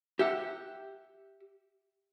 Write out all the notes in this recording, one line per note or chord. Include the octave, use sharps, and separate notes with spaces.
G4 E5 F#5